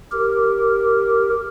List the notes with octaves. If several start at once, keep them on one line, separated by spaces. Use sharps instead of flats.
G4 A#4